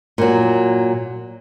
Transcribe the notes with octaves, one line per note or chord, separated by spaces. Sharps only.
A#2 F#3